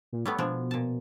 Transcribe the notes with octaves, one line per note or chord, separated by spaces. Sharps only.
A#2
G3 A3 B3 C#5
B2 F3 G#3 D4
A#2 A5